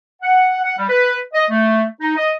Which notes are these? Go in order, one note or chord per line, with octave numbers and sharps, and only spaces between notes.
F#5
F#5
G3
B4
D#5
A3
D#4
D#5